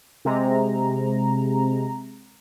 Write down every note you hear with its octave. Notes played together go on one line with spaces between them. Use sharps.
C3 G#3 A#5